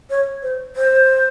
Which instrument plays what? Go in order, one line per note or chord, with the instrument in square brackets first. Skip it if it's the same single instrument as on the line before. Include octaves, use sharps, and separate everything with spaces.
[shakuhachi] C#5
C5
C5